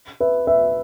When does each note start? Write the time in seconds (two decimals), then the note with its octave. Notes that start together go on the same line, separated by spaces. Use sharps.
0.20 B4 E5
0.47 B4 E5